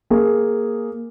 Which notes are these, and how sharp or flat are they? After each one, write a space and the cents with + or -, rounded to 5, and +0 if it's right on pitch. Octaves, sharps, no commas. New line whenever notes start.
A#3 +0 G#4 +0